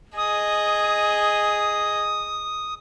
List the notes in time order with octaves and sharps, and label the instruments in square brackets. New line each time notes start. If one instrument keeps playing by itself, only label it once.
[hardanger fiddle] G#4 D#5 [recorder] D#6